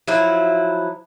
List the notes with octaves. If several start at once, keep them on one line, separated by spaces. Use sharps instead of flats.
F3 F#3 E4